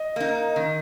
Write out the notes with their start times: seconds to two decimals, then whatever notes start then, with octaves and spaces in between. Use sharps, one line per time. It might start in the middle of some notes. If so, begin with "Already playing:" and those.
Already playing: D#5
0.16 A#3 D#4
0.56 D#3